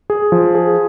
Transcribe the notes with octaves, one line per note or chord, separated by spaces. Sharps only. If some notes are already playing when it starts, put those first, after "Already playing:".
G#4
F3
G#4